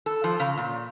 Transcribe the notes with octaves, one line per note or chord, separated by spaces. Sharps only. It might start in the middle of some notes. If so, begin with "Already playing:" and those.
A4
F3
C#3
A#2